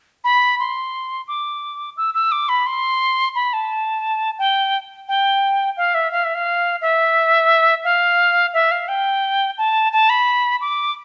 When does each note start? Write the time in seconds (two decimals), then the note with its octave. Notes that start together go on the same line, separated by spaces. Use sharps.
0.24 B5
0.59 C6
1.27 D6
1.97 E6
2.14 E6
2.31 D6
2.48 B5
2.66 C6
3.35 B5
3.53 A5
4.38 G5
5.08 G5
5.77 F5
5.94 E5
6.11 F5
6.24 E5
6.34 F5
6.81 E5
7.84 F5
8.53 E5
8.71 F5
8.88 G5
9.58 A5
9.92 A5
10.09 B5
10.60 D6